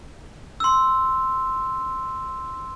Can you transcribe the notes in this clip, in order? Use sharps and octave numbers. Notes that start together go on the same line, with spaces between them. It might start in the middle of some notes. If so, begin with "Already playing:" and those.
C6 E6